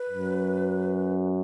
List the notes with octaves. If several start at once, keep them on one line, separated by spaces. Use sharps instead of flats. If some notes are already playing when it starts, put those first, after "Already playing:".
Already playing: B4
F#2